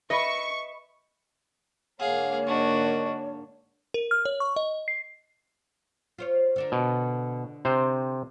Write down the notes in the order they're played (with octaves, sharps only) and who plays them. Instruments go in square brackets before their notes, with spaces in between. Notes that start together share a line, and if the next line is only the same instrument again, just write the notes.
[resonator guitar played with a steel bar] B4 E5 [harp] D#5 [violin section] C#6
[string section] G#2 D3 A#3 [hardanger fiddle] G#4 F5 [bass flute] C#5 [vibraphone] F#5
[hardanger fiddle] D4 F#4 [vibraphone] D#5 A5 C#6
[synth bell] A#4
F6
C#5
C#6
D#5
C7
[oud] F4 C5 C#5
D3 D4 A#4
[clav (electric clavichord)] B2
C3 C5